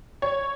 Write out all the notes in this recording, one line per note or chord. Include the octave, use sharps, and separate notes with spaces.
C#5